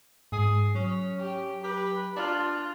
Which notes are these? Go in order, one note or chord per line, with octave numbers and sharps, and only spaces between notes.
G#2 G#4
F#3 C#4
G4
G4 B4
D4 F4